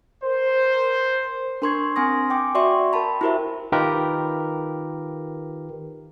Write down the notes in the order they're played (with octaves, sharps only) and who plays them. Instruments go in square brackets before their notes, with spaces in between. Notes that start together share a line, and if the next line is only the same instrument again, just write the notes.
[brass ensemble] A#4 C5
[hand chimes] D4 A#4 C6 C#6 G#6 C7
C4 G#5 C6 D#6 A#6
G5 D6
F#4 D5 E5 C6 C#6
A#4 G5 A5 B5
E4 F#4 G4 A#4 C5 E5
[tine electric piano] D#3 F4 G4 A#4 B4